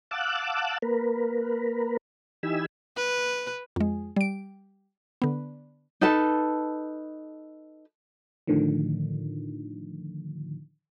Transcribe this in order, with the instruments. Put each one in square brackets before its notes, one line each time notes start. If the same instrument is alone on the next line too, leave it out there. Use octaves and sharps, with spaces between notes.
[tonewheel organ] F5 F#5 A5 D6 E6 F#6
A#3 A#4 B4
E3 D#4 G4 G#5 B5 E6
[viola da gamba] B4
[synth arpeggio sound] F2 G#3
G3 D7
D3 B3
[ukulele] D#4 A4 B4 A5
[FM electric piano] A2 D3 D#3 F3